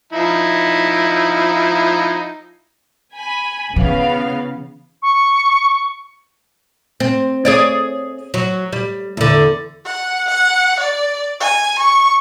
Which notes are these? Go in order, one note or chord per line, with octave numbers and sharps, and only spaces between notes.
F3 D#4 E4
G#5 B5
C#3 E3 B3 F5
C#6
C4
G#4 C#5 D5
F#3
G3
E2 D3
F#5
F#5
D5
G#5
C#6